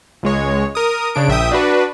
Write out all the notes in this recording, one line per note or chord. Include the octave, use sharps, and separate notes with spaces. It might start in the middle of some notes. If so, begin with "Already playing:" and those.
C#2 G#3 C#5
A#4 D#6
C#3 D4 D7
A#1 E5 G5 D#6
D4 F#4 B4